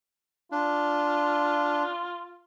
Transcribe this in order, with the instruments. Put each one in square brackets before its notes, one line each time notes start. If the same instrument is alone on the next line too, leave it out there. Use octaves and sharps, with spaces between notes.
[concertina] D4 [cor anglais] F4